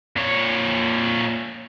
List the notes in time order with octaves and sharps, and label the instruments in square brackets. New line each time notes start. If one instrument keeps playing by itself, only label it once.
[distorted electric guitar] A#2 C#5